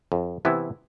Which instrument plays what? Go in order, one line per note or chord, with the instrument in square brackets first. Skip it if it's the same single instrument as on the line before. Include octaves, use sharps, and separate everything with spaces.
[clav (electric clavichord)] F2
C3 E3 B3 E4